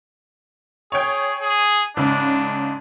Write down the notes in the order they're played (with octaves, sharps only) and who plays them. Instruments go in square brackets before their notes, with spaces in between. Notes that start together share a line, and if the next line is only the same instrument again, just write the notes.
[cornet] G#4 [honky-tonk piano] C#5 G5
[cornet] G#4
[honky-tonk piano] G#2 C#3 [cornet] D4